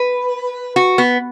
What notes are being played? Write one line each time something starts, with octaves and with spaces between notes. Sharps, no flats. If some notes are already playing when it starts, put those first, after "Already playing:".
Already playing: B4
F#4
B3